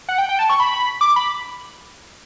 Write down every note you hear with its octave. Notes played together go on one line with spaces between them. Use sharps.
F#5
G5
G5
A5
C#6
B5
D6
B5